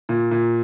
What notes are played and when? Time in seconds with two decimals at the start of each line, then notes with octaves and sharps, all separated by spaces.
0.09 A#2
0.31 A#2